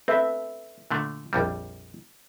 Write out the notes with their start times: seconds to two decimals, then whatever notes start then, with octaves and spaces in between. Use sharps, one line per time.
0.08 C4 A4 B4 E5
0.91 A#2 D3 A3
1.33 A#1 F2 G3